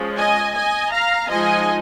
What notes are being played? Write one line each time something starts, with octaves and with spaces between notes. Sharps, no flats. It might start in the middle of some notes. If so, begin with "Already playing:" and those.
Already playing: F3 G#3 C#4
D#5 G#5
D#5 G#5
F5 A#5
F3 G#3 D#4 D#5 G#5